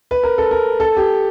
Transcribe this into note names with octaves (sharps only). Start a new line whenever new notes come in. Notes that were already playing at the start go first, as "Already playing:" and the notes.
B4
A#4
A4
A#4
A4
G4